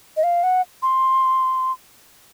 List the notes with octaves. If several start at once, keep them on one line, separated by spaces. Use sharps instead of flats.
D#5
F5
F#5
C6